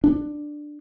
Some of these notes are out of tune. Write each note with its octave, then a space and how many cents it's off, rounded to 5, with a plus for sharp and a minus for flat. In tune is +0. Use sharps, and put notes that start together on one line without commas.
D4 +10